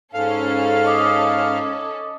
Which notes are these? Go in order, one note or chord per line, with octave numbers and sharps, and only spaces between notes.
G#2 C#4 A4 F5
D#5 D6 D#6